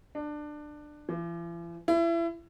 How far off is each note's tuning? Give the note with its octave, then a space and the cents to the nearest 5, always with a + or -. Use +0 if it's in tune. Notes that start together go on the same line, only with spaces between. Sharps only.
D4 +20
E3 +45
E4 +30